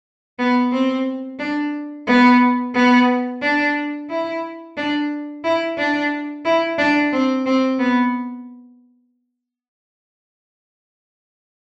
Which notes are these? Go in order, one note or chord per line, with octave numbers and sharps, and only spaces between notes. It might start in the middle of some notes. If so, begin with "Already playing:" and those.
B3
C4
D4
B3
B3
D4
E4
D4
E4
D4
E4
D4
C4
C4
B3